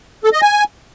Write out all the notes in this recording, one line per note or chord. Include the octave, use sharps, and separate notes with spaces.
A4
D#5
G#5